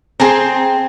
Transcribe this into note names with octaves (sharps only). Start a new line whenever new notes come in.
C4 G#4 A5 A#5